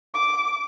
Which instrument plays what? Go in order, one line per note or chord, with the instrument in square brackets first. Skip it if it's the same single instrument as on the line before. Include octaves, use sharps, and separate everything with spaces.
[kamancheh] D6